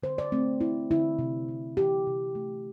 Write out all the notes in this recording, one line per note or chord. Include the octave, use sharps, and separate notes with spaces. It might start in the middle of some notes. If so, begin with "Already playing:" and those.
D3 C5
D5
A3 C4
A3 E4
D3 E4
C3
C3
E3 G4
C3
A3